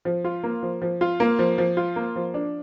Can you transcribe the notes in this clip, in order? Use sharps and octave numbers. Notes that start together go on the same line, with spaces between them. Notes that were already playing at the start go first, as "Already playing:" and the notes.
F3
F4
A#3
F3
F3
F4
A#3
F3
F3
F4
A#3
F3
D4